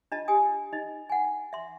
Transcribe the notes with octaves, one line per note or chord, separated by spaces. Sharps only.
D4 F4 D#5 A5
G4 G#5 D#6
D#4 D#5
F#5 G#5
E5 C6